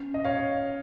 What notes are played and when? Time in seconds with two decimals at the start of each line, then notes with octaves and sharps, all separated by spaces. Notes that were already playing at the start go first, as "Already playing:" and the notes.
Already playing: C#4
0.14 D#5
0.24 C#5 F5